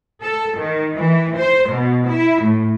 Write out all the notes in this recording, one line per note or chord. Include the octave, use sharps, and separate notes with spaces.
A4
D#3
E3
C5
B2
E4
A2